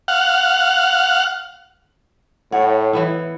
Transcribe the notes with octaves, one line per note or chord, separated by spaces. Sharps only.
F5 F#5
A2 C#5 F#5
E3 B3 E4